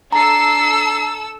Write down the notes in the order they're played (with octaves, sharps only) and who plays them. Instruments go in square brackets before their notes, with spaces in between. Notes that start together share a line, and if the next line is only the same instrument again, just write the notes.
[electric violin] D4 C7 [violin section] A4 E6 [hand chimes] A#5